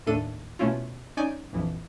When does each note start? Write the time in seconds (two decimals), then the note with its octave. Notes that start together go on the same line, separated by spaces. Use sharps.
0.06 D#2 A2 A3 D4 A4 D#7
0.59 B2 A3 C#4 E4 F4
1.17 C#4 D#4 D5 G#5 G6
1.53 A#1 F2 E3 F3